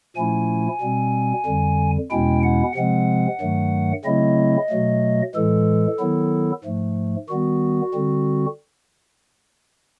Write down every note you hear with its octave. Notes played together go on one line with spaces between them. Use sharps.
A#2 F3 A3 C#4 E4 G#5
B2 G3 C4
F2 D3 G3
E2 B2 G#3 C#4 E4 G5
F#5
C3 F3 G#3 C4 F#5
G2 D#3 F#3 A3
C#3 F#3 A3 C4 E4 D#5
B2 F#3 A3
A2 E3 G#3 A4
D#3 F#3 B3 E4
G#2 F3 A3
D#3 G3 B3 F#4
D3 G3 C4